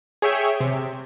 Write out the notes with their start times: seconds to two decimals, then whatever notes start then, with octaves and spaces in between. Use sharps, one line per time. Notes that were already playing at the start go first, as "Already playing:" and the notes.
0.22 G#4 C#5 E5 G5
0.60 C3